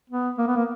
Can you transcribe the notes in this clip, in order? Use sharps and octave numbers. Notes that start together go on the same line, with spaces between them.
B3
A#3
B3
A#3